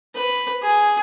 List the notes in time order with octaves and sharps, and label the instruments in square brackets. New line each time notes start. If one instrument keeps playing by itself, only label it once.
[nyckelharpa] B4
G#4